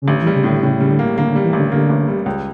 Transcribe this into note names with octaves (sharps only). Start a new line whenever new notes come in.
C#3
A1 D3
E3
G3
C#3
A2
D3
A2 C#3
C#3 G3
D3
A#3
D3 A#3
D3
G3
E3
A1 D3
D3 A#3
A1
G3
C#2